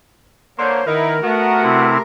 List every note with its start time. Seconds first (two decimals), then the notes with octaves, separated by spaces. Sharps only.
0.58 D3 A#3 C5 C#5
0.87 D#3 B3 D#4 E4 A#4
1.23 A3 B3 F#4
1.63 C3 C4 E4